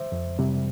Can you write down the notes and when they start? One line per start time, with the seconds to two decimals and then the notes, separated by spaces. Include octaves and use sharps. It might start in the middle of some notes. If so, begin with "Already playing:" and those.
Already playing: C5 E5
0.12 F2
0.39 C3 G3